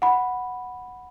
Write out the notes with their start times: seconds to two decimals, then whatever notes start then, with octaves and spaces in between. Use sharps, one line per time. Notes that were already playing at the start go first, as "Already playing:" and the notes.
0.02 F#5 B5